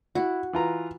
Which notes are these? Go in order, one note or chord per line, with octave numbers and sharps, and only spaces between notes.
E4 F#4
E3 F4 A#5